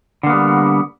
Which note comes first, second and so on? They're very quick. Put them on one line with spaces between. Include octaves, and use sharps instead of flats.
D3 A#3 B3 G3